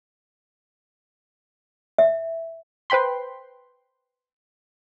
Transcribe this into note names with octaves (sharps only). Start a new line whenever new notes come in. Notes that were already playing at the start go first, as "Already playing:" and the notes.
E5
B4 C5 G5 B5 C6